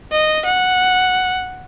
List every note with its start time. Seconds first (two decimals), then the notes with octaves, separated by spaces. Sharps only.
0.12 D#5
0.46 F#5